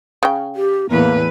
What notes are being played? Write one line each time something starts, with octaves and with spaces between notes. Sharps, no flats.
C#3 G5
G4
E2 A2 A#3 B4